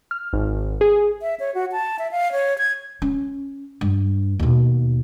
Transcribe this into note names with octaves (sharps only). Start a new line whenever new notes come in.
F6
G#1
G#4
E5
C#5
F#4
A5
E5
F5
C#5
G#6
C#4
G2
D#2 B2